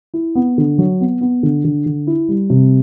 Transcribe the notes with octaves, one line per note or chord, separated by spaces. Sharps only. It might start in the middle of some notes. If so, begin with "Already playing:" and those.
E4
B3
D3
F#3
B3
B3
D3
D3
D3
E4
G3
C3